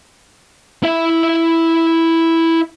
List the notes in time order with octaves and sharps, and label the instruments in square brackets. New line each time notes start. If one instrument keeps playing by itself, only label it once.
[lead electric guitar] E4 E5